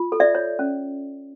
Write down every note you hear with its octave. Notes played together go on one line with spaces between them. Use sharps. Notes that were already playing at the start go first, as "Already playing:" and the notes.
Already playing: F4
A4
D5 E5
C#5
C#4